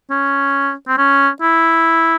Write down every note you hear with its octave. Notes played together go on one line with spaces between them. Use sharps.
C#4
C4
C#4
E4